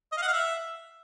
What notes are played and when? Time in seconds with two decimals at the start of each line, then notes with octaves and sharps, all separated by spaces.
0.12 D#5
0.17 F5
0.22 F#5
0.27 F5
0.33 E5